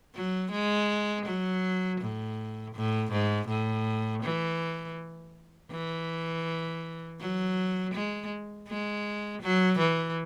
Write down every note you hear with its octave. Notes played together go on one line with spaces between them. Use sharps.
F#3
G#3
F#3
A2
A2
G#2
A2
E3
E3
F#3
G#3
G#3
F#3
E3